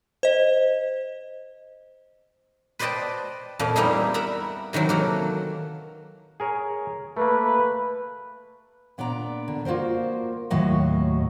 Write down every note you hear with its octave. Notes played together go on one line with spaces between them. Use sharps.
C5 D#5
B4 C5 D5 D#5 G5 A5
F2 A#2 F3
G3 A#3 B3 D#4 E4 G#4
A#4 E5 F#5 A#5 B5
C3 D#3 E3 F#3
A#3 F#4 A4
G#4 A#4 C#5
A3 A#3 B4
A#2 B3 D4 D5 A#5
D3
A#3 F4 F#4 A#4 C5
D#2 A2 F#3 F#4 D#5